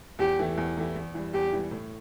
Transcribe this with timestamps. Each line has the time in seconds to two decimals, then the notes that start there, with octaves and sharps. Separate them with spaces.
0.19 E2 G4
0.39 E3 A3 E4 G4
0.58 E2
0.77 E3 A3 E4 G4
0.96 E2
1.14 E3 G3
1.34 E2 G4
1.52 E3 G3
1.71 A2